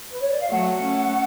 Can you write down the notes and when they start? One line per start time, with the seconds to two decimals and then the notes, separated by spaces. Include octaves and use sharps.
0.10 B4
0.21 C#5
0.30 D5
0.41 F5
0.50 F#3 A3 F#5
0.84 A3 C#4